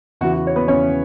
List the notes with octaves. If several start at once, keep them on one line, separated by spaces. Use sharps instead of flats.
E2 C#3 E3 F#4
F#4
C#5
B3 B4
E2 C#3 E3 C#4 C#5